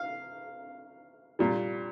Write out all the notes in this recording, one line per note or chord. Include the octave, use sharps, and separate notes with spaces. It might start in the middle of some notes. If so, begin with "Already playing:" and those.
Already playing: F5
A#2 G3